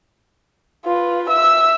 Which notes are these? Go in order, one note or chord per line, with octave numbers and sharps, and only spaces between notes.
F4 B4
E5 E6